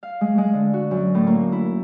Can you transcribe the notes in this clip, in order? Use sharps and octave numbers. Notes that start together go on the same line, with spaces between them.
F5
G#3
G#3
D3
F#4
F#2
A2
A#3
E4